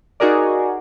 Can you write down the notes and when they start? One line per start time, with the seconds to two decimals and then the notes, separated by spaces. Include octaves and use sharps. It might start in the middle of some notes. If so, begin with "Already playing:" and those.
0.20 D#4 F#4 G#4 A#4 D5